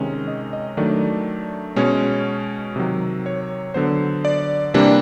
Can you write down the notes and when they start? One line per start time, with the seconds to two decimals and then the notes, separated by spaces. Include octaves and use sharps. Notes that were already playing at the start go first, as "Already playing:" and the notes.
Already playing: C3 D#3 G#3 C#4
0.27 D#5
0.53 D#5
0.77 D#3 F#3 A3 D4 D5
1.76 B2 G#3 C#4 C#5
2.76 C3 D#3 F#3
3.26 C#5
3.74 D3 F#3 B3 C5
4.25 D5
4.74 C3 E3 G3 A#3 D4